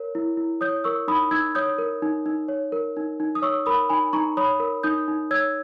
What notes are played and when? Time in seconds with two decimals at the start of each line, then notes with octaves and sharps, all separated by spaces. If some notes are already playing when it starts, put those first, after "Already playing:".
Already playing: A#4 C#5
0.15 E4
0.37 E4
0.61 C#5 D#6 G6
0.84 A#4 C#6 E6
1.08 D#4 B5 D#6
1.31 D#4 E6 G#6
1.55 C#5 D#6 G6
1.78 A#4
2.02 D#4
2.26 D#4
2.48 C#5
2.72 A#4
2.97 D#4
3.20 D#4
3.35 D#6
3.42 C#5 C#6 E6
3.66 A#4 B5 D#6
3.89 D#4 G#5 B5
4.13 D#4 A#5 C#6
4.37 C#5 B5 D#6
4.60 A#4
4.83 D#4 D#6 G6
5.08 D#4
5.31 C#5 E6 G#6